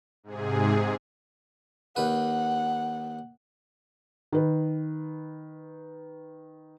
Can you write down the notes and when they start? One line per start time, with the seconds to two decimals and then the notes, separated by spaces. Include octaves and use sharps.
0.24 G#2 C3 G#4
1.96 D#2 B4 F#5
4.32 D#3 B4